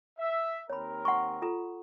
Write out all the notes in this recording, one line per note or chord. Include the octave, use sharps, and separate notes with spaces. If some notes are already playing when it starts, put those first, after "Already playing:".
E5
D#2 C4 A#4 C#5 B5
F#5 C6 C#6
F4 A4 A#5